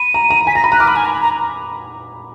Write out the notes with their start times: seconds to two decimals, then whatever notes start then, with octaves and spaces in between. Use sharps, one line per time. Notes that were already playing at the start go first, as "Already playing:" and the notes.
Already playing: B5 D#7
0.14 A#5
0.30 A#5
0.47 G#5 B6
0.55 A#5 A#6
0.64 B5
0.72 A#5 F#6
0.80 D6 F6
0.88 B5
0.96 G#5
1.05 A#5
1.13 B5
1.21 A#5